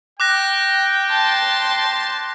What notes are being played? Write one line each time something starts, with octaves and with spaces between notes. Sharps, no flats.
G5 D6 F#6 A#6
A5 C6